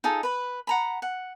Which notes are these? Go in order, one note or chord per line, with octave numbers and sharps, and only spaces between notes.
D#4 F4 G#4 A4
B4 B5
F#5 A#5 B5
F#5